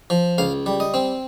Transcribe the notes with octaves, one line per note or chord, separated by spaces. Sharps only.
F3
C#2 F5
G3
D#5
C4